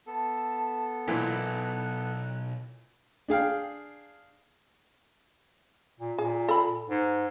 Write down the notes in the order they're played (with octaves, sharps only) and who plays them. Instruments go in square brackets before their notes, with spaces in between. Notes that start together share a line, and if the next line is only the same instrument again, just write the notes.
[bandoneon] B3 A4 [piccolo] A5
[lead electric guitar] B1 [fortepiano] A#2 E3 [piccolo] F#6
[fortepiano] D4 G#4 F5 G5
[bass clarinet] A#2
[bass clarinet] A#2 [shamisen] G#4
[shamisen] A4 B5
[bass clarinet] G#2